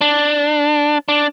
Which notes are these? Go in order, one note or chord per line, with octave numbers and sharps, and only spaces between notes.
D4
D4